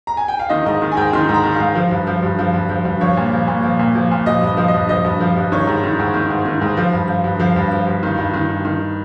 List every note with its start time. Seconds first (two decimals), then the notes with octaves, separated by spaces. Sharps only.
0.07 A#5
0.17 G#5
0.28 G5
0.39 F5
0.50 D#3 D#5
0.66 G#2 D#5
0.82 D#3
0.92 G#5
0.97 G#2 G5
1.13 D#3 C6
1.29 G#2
1.34 A#5
1.44 D#3
1.54 F5
1.60 G#2
1.75 F3
1.91 G2
2.07 F3
2.23 G2
2.39 F3
2.54 G2
2.69 F3
2.85 G2
3.01 F3 C#5
3.17 A#2
3.32 F3
3.48 A#2
3.63 F3
3.79 A#2
3.95 F3
4.11 A#2
4.26 F3 D#5
4.41 G2
4.47 D#5
4.57 F3
4.68 D#5
4.74 G2
4.89 F3 D#5
5.04 G2
5.20 F3
5.36 G2
5.52 D#3 C#5
5.67 G#2
5.84 D#3
5.99 G#2
6.14 D#3
6.30 G#2
6.45 D#3
6.61 G#2
6.77 F3
6.93 G2
7.08 F3
7.24 G2
7.40 F3 F5
7.56 G2
7.72 F3
7.87 G2
8.03 D#3
8.18 G2
8.34 D#3
8.49 G2
8.65 D#3